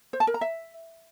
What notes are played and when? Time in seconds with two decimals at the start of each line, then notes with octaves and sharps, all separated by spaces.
0.13 C5
0.20 A5
0.27 A#4
0.34 A#5
0.41 E5